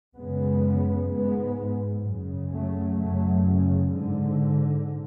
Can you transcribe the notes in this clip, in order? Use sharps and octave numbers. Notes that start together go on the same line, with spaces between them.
F#2 C#3 G#3 B3
G#2 G#3 B3
F#2 C#3
F#3 A3
F#2 C#3 F#3 A3
C#3
G#2 D3